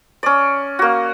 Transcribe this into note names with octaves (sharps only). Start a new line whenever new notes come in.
C#4 D5
A#3 F#4